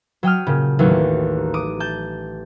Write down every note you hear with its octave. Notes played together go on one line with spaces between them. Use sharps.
F#3 G5 D#6 F6
A#2 C#3
A1 D#2 F#3
D6 D#6 D7
A5 G6